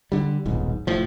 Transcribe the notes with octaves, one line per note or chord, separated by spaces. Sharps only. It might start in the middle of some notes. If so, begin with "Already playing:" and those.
D3 G3
D#1 B1 G#2
F1 A2 F3